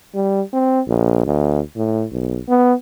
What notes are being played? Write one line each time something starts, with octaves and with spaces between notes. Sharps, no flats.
G3
C4
A#1
D2
A2
B1
B3